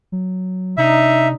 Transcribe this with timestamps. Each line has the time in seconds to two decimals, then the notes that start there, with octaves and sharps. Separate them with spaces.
0.12 F#3
0.77 C3 D4 D#4 E5